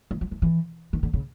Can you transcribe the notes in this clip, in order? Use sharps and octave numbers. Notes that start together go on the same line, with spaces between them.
E3
F3
E3
E3
D#3
D3
C#3